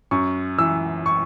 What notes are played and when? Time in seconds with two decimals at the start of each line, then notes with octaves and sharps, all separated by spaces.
0.11 F#2 C#6
0.58 E3 E6
1.06 C#6